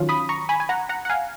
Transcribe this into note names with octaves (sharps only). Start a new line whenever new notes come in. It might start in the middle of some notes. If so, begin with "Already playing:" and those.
Already playing: D#3 F#3 C#4 F4
B5 D#6
A#5 C#6
G#5 B5
G#5
F#5 A#5
F#5 A#5
F#5
F5 G#5